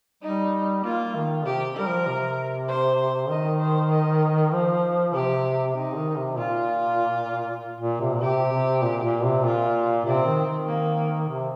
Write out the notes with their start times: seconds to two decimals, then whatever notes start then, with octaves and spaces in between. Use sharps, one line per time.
0.23 G3 D#4
0.85 A#3 F4
1.15 D#3
1.46 C3 G4
1.77 G3 A#4
1.87 F3
2.07 C3
2.69 C5
3.30 D#3 D#5
3.60 C5
3.91 D#5
4.53 F3 C5
5.14 C3 G4
5.76 C3 D#4
5.97 D#3
6.17 C3
6.37 A#2 F4
7.80 A#2
8.01 C3
8.14 A#2
8.22 C3 G4
8.52 C3
8.83 A#2
9.04 A#2
9.25 C3
9.44 A#2 F4
10.06 C3 C4
10.26 D#3
10.47 D#3
10.68 A#3
11.29 C3